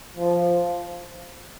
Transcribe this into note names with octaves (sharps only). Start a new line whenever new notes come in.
F3